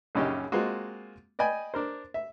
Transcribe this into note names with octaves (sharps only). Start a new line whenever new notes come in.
A#1 F#2 C#3 C#4 D#4 G4
G#3 A#3 C4 F4 F#4
D5 D#5 G5 G#5 B5
D4 A#4 C5
E5